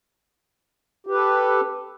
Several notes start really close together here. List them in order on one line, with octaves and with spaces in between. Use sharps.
G4 B4 A4